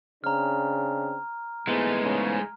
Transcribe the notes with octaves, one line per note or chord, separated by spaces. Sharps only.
C#3 C4 D4 A#5 F6
G#2 E3 G#3 A3 B3
G#2 C#3